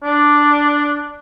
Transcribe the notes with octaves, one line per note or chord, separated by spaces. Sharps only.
D4